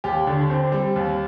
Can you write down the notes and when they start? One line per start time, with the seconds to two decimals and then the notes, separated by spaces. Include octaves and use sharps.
0.04 D#2 G4
0.27 D3
0.50 C4
0.72 G3
0.96 D#2